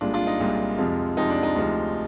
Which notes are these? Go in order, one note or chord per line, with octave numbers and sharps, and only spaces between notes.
C2 A#2 G#3 D4 F4
D4 F4
D#4
C2 A#2 G#3
F2 C3 F3 G#3
F2 C3 F3 G#3 D#4
D4
D#4
D2 C3 F3 G#3